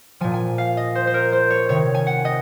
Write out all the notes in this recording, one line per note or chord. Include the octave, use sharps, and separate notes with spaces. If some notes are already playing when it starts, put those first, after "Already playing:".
A#2 F3 G#5
G#5
F5
D#5
C5
C5
A#4
C5
C#5
C3 D#3 C#5
G#5
F#5
D#5